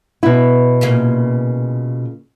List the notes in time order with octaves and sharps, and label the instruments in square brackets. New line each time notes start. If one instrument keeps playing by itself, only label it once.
[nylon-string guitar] B2 E4
[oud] A#2 C#3 A#3